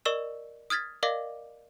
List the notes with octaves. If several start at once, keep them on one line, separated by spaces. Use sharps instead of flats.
A#4 D5 D#5 C#6 E6 E7
D#6 F6 G#6 A6 B6
A#4 D5 D#5 F5 D6 A#6